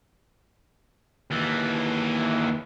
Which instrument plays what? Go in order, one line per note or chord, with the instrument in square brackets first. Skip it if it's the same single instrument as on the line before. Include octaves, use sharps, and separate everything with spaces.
[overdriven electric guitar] D#2 E3